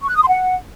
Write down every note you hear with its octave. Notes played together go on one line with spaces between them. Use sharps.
C#6
F#6
D#6
C6
F#5